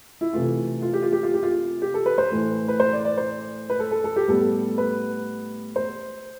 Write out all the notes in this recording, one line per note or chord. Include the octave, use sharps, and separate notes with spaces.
E4
C3 E3 A3 F4
F4
G4
F4
G4
F4
G4
F4
G4
A4
B4
C5
A2 E3 A3
B4
C5
D5
D5
C5
B4
A4
A4
A4
G4
A2 G3 B3 A4
B4
C5